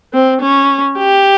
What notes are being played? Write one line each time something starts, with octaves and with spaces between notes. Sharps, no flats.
C4
C#4
G4